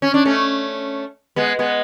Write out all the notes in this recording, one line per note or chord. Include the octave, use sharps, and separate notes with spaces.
C#4
D4
A3 C#4
G#3 B3
G#3 B3